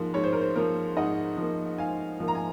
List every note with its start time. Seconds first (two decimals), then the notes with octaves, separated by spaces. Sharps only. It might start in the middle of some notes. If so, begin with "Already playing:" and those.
Already playing: G#2 F3 A#3
0.14 G#2 C#5
0.23 C5
0.33 A#4
0.41 C5
0.55 F3 A#3 A#4
0.97 G#2 D#5 F#5
1.37 F3 A#3
1.78 G#2 F5 G#5
2.20 F3 A#3
2.28 A#5
2.35 G#5